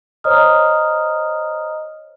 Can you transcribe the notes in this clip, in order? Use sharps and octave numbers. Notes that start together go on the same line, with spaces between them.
C5 C#5 D#5 A#5 D#6 F6